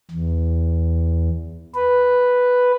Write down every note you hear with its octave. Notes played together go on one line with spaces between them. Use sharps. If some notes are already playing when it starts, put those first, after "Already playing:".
E2
B4